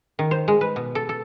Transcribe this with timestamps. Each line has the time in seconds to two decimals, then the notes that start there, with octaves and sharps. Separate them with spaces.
0.19 D#3
0.31 C5
0.48 G#3
0.61 B4
0.76 B2
0.95 A4
1.09 A4